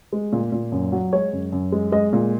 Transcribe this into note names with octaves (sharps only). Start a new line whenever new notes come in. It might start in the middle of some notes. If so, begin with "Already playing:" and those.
G#3
A#2
A#2
F#2
F#3
G#3 C#5
F#2
F#2
G#3
G#3 D#5
A#2